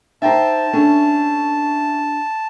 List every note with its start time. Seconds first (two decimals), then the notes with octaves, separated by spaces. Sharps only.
0.22 D#4 C5 E5 G5 A5 A#5
0.73 A3 C#4 D4 A4